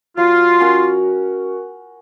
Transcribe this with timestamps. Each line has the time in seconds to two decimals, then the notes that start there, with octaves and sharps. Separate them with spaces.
0.17 F#3 F4
0.60 C#4 F#4 A#4